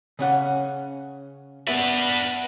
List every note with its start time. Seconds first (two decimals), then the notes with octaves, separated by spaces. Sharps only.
0.19 C#3 C#4 F#5
1.67 B3 D4 B4 E5